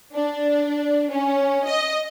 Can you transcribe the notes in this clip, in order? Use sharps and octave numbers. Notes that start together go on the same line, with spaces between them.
D4
C#4
D#5